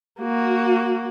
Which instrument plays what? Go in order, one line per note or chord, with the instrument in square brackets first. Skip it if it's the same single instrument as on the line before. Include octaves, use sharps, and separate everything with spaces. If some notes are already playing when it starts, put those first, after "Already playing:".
[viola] A#3 F#4